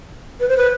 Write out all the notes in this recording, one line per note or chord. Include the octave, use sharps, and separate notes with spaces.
B4
C5
B4